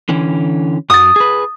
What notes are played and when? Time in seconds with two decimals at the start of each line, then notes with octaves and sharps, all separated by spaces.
0.09 D3 E3 C#4
0.90 F#2 F#3 D#6 A6
1.16 G#4 B4